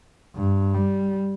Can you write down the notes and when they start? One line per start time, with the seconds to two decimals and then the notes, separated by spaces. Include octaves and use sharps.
0.36 G2
0.74 G3